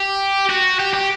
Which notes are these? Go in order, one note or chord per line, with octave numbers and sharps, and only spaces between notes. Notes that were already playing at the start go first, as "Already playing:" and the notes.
Already playing: G4
F#4
G4
G4